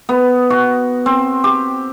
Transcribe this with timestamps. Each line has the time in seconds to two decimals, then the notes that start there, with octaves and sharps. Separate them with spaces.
0.09 B3
0.50 F#4
1.06 C4
1.44 G4